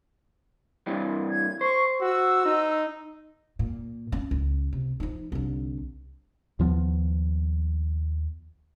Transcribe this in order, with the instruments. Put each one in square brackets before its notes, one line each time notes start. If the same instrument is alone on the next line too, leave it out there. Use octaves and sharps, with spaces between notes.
[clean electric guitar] G2 C3 E3
[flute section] G#6
[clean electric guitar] C5 [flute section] C#6
[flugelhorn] F#4 [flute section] E6
[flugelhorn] D#4
[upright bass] A#2
B3 C#4
C#2
C3
F3 D#4
C2 D3
[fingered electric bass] D#2 F3 G#3 B3